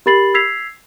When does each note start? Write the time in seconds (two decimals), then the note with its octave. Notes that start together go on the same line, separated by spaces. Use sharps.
0.06 G4 A#4 B5 A6 C7 F#7
0.34 E6 G#6 B6 C7 F7